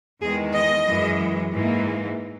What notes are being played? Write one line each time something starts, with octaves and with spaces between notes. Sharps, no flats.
E2 D#3 G#3 G#4
D#5
F#2 E3 G#3
G#2 E3 A#3